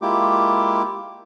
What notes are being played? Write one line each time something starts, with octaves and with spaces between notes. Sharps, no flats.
G#3 A#3 E4 F4 G4 D6